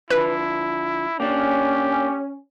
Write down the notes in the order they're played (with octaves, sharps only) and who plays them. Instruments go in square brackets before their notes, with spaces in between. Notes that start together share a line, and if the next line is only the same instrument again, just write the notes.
[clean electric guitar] D3 F3 [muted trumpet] E4 [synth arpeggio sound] B4
[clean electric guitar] A#3 D4 [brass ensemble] C#4 [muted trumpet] G4